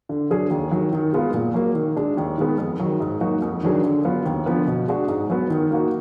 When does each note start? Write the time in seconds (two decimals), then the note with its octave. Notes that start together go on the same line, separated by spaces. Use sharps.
0.09 D3
0.30 F#3 D4 G#4
0.51 D#2
0.71 D#3 F#3
0.93 D#3
1.13 G#3 B3 F4
1.34 A#2
1.54 F#3 A#3
1.75 D#3
1.97 G#3 D4
2.17 D#2
2.38 D#3 G#3 B3
2.58 F2
2.79 D#3 F#3
3.00 G#2
3.21 F#3 A#3 D#4 F#4
3.42 F2
3.63 D#3 F#3 D4 G#4
3.83 D3
4.05 F#3 B3 F4
4.25 D#2
4.46 D3 F3 B3
4.67 B2
4.87 G#3 D4 F#4
5.08 G#2
5.30 F#3 B3
5.50 D#3
5.71 A#3 D#4 F#4